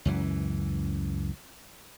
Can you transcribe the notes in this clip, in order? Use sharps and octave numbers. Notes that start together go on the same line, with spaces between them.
C#2 F#2 E3